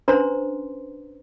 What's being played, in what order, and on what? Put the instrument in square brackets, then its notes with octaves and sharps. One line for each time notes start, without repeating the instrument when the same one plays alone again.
[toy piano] C#4 D4 B4 C5 A#5 C6